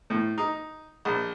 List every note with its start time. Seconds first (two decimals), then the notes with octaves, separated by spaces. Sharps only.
0.10 A2
0.38 D#4
1.05 A#1